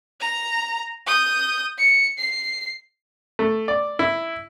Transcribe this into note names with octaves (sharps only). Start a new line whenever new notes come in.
A#5
D#6 G6
C#7
C7
A3
D5
E4